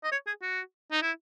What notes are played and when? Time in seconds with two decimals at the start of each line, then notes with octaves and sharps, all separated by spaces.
0.04 D#5
0.12 C#5
0.27 G#4
0.42 F#4
0.92 D#4
1.02 E4